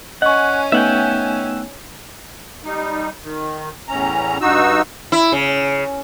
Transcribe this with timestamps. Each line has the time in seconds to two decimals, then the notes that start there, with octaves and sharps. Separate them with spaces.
0.22 C#4 D#5 F#5 G#5 C#6
0.72 A3 B3 D#4 E5 F#5 G5
2.63 G3 D#4
3.23 D#3
3.89 E2 A2 C#4 A#5
4.41 G2 D#4 F#4 E6
5.12 E4
5.32 C#3